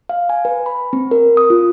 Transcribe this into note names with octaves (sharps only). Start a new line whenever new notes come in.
F5
G#5
B4
B5
C4
A#4
D#6
F4